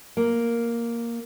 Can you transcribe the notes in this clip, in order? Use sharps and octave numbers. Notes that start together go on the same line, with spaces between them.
A#3